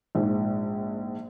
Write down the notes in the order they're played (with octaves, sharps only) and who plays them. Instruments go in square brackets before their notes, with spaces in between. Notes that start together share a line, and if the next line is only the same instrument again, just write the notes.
[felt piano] A#1 G#2